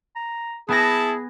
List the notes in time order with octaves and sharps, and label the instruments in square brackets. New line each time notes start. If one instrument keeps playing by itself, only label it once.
[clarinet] A#5
[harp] B3 G#5 A#6 [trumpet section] E4 A5 [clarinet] G#4